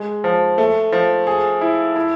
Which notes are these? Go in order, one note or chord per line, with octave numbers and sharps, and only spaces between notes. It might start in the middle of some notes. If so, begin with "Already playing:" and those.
Already playing: G#3
F3
A3
F3
G#4
E4
E4